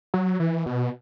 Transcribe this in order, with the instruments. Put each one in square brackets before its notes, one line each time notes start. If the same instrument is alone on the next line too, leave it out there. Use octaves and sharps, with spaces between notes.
[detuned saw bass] F#3
E3
B2